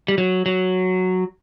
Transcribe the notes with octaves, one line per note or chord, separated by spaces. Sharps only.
G3
F#3
F#3